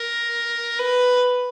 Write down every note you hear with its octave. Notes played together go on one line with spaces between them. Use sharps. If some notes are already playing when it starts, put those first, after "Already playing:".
Already playing: A#4
B4